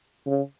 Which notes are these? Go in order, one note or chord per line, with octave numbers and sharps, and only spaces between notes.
C#3